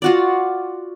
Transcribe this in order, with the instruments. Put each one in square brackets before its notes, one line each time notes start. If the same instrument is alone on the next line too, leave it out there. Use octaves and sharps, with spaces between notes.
[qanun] F4 F#4 D5